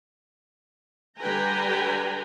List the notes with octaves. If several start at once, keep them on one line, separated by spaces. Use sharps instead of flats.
D3 G3 B4 G5 G#5 A#5